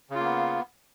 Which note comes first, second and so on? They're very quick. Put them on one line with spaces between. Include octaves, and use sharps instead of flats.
C#3 F4 A#3 B3